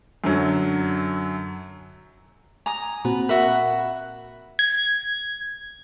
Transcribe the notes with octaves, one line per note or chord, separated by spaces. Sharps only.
F#2 D3 F#3
G#5 A#5 D#6
A#2 C4 F#4 B4
F#4 A#4 E5 B5 F#6
G#6